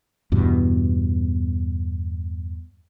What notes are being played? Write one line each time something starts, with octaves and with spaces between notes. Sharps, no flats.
E2 G2 B2